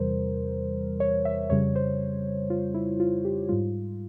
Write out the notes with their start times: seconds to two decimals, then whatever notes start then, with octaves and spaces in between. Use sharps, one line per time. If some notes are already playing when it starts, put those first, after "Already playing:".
Already playing: E2 C3 E3 G3 A#4 C5
1.00 C#5
1.25 E5
1.50 F2 C#3 G3 C#5
1.76 C5
2.50 F4
2.74 E4
3.00 F4
3.25 G4
3.49 G#2 G3 F4